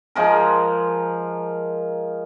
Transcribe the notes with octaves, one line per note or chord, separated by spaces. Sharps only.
F3 G#3 A#4